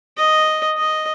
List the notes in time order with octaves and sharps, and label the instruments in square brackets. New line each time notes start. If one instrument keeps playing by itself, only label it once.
[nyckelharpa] D#5
D#5